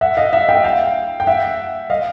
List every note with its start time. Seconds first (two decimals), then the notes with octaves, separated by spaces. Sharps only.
0.01 E5 F#5
0.17 D#5 F5
0.33 E5 F#5
0.49 F5 G5
0.64 F5 G5
1.20 G5
1.27 E5 F#5
1.90 D#5 F5